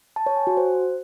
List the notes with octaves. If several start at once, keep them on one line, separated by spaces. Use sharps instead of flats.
A5
C#5
G#5
F#4
C5